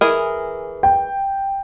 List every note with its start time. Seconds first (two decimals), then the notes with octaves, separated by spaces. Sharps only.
0.01 E3 G#4 A#4
0.83 G5